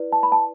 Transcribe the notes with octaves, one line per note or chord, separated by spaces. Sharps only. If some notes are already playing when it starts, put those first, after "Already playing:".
Already playing: E4 B4 D5
A5
B5
A5